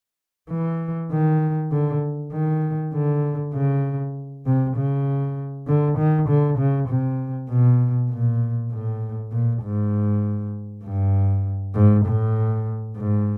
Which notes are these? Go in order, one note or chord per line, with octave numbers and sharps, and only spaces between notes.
E3
D#3
D3
D#3
D3
C#3
C3
C#3
D3
D#3
D3
C#3
C3
B2
A#2
A2
A#2
G#2
G2
G#2
A2
G#2